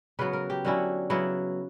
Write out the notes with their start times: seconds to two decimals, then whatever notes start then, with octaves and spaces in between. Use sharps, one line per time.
0.19 C#3 F#3 B3 B4
0.33 A#4
0.50 G4
0.65 D3 F#3 C#4 E4
1.10 C#3 F#3 B3 E4